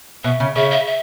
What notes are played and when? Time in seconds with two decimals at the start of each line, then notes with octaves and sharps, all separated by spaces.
0.24 B2 E5
0.40 C#3
0.55 C#3 E5
0.71 E5
0.86 E5